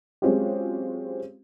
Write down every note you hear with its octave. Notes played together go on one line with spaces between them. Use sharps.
F#3 G#3 C4 C#4 F4 G4